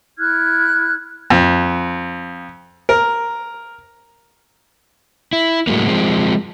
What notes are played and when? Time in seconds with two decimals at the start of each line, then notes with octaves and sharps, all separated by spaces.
0.18 E4 F6 F#6 G#6
1.30 F2
2.89 A#4
5.33 E4
5.67 A2 F#3 G#3 A#3
5.87 F3 G#3 C4